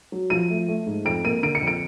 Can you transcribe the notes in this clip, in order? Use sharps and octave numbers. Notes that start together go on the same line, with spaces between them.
F#3
F3 D#7
A3
A3
G#2
F2 D7
A#3 D#7
D3 D7
C#7
F2
D7